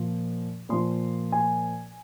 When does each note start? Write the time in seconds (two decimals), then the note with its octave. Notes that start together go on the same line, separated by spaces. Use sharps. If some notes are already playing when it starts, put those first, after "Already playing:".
Already playing: A#2 F3
0.69 A#2 F3 C6
1.32 G#5